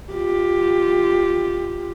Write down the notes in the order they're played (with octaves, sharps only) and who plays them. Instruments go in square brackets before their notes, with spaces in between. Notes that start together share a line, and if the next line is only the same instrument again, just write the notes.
[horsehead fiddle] F4 G4